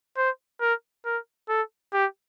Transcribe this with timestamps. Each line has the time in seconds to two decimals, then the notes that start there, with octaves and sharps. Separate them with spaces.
0.17 C5
0.61 A#4
1.05 A#4
1.49 A4
1.93 G4